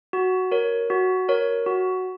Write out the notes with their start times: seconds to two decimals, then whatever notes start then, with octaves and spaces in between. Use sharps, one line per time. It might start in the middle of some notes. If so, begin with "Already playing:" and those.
0.13 F#4
0.51 A#4 C#5
0.90 F#4
1.29 A#4 C#5
1.66 F#4